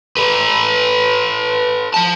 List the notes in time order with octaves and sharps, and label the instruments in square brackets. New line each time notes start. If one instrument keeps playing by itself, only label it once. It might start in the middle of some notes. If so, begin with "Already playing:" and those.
[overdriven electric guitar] A4 B4
F3 A5